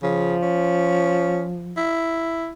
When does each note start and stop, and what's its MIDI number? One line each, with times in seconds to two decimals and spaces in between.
0.03 0.36 49
0.03 1.83 53
0.43 1.47 61
1.77 2.53 64